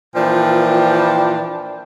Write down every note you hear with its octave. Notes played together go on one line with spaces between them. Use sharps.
A#2 E3 F3 D4 G5